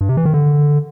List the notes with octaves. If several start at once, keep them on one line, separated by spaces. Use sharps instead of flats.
G2
C3
E3
D#3
D3